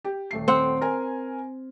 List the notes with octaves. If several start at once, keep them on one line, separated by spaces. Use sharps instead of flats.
G4
D#1 A3 C7
C4 F#5
A#4 G#5